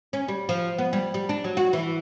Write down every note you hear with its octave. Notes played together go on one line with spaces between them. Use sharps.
C#4
G3
F3
B3
G3
G3
D4
F#3
F#4
E3